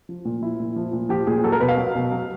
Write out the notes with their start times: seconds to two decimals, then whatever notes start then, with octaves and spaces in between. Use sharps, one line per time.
0.09 F3
0.25 A#2
0.42 F3 E4
0.60 A#2
0.76 F3
0.93 A#2
1.09 F3 G4
1.27 A#2 G#4
1.44 F#3 A4
1.52 A#4
1.60 B2 B4
1.68 F5
1.77 F#3
1.95 B2
2.12 F#3